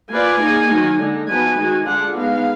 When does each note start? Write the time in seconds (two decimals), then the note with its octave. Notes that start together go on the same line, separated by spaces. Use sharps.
0.11 A#3 F4 B4 D5 G#5
0.40 A#3 D#4 G#4
0.70 D#3 F#3 A#3 D#4
0.99 D3 G#3 D#4
1.28 F3 B3 D#4 F#4 B4 G#5
1.58 D#3 G#3 D#4 F#4
1.86 D3 G#3 D4 F4 G#4 F#5
2.16 G#3 B3 D#4 F5